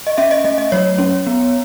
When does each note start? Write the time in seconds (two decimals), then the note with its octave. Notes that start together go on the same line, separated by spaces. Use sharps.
0.07 D#5
0.18 C#4 E5
0.31 D#5
0.44 A3 D#5
0.58 D#5
0.72 F#3 C#5
0.98 C#4
1.27 B3